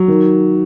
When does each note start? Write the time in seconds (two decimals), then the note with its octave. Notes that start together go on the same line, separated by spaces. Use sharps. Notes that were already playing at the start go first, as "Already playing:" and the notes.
Already playing: F#3
0.08 D#3